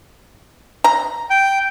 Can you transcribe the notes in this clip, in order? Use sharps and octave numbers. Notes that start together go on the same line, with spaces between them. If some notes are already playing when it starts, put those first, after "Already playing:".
A#5
G5